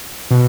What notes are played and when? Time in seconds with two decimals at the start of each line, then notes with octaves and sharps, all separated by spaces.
0.31 B2